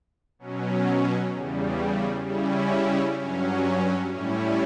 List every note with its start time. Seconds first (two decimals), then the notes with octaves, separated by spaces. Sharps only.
0.39 B2 F#3 C#4
1.32 E2 C#3 G3
2.24 C#3 G3 C#4 E4
3.17 G2 F#3 C#4
4.10 A2 G3 C#4 E4